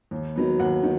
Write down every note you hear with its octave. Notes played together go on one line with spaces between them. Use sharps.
D#2
D#3 F#3 B3
D#2 F#5
D#3